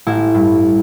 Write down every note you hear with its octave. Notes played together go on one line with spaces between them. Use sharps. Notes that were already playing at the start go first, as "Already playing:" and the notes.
A1 E4
G2